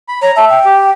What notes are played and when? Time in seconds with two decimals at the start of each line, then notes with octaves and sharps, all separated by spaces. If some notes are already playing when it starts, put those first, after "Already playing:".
0.09 B5
0.22 C#5 A#5
0.36 E5 A5
0.49 G5
0.65 G4